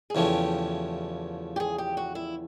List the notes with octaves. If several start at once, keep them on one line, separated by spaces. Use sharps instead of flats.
G#4
E2 C#3 F3 A3 G4
G4
G#4
G4
F#4
E4